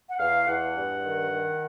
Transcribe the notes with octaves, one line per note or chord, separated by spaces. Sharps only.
F#5
E2 F5
E2 F#5
G2
D#3
D#3